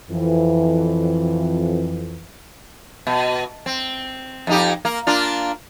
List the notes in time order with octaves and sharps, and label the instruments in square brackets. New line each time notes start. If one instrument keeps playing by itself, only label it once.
[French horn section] F2 E3
[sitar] B2
C4
F2 D#4 G4
A#3
A#3 D4 F4